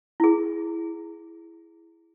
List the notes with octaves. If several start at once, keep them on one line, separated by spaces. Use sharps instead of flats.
E4 G#4